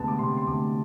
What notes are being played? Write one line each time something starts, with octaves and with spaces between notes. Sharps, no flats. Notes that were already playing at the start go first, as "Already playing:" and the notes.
Already playing: D2 C3 G#3 B3 A5
D6
C3 C6
C6
D2 D6